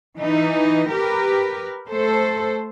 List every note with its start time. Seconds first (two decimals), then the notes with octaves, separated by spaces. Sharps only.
0.18 E3 D#4
0.91 G4 A#4 B4
1.89 A3 A4 C5